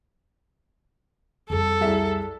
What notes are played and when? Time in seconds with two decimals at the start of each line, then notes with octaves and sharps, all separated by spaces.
1.50 F2 G3 A4
1.81 C2 G#4 E5